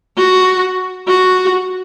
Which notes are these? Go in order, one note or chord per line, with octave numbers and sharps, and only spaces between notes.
F#4
F#4